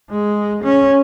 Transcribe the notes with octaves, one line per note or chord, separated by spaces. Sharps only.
G#3
C#4